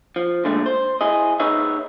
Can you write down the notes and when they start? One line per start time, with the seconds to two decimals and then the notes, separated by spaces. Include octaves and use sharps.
0.16 F3
0.44 A#2 D3 G#3 A3
0.66 C5
1.01 E4 G#4 D#5
1.40 D#4 G#4 B4 C#5 D#5 E5